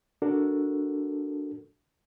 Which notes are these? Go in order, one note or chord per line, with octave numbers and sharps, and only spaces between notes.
D4 F#4 A4 A#4